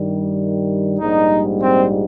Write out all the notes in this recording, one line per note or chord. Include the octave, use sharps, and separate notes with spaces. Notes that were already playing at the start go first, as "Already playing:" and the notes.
Already playing: G2 D#3 G3
A#1 G#2 G3 D#4
C4